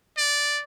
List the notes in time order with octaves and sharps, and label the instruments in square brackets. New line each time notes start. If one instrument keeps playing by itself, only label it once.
[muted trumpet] D5